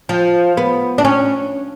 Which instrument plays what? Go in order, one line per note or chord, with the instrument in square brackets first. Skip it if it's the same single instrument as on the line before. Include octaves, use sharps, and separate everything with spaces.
[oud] F3
B3
D4
C#4